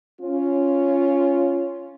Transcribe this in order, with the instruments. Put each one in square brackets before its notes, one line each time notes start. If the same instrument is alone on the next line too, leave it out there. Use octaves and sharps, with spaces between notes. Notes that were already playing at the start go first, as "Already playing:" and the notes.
[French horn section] C#4 F4